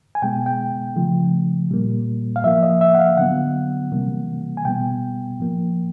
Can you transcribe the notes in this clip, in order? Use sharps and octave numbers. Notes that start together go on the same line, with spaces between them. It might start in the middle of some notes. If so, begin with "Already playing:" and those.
G#5
B2 G#3 B3 G5
G5
C#3 F3 A3
A#2 G3 A#3
F5
A2 F3 A#3 E5
D#5
E5
F#5
F5
D3 F#3 B3 F#5
C3 E3 G3 A#3
G#5
B2 G3 B3 G5
A2 F3 A#3